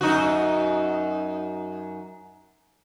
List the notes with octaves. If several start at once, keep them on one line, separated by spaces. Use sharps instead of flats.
F#2 D#4 F#4